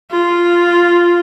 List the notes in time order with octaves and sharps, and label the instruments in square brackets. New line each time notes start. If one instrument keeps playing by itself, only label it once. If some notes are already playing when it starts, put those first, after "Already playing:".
[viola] F4